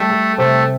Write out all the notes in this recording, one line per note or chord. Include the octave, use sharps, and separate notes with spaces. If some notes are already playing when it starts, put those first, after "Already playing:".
Already playing: G3 A3
A4
C3 A3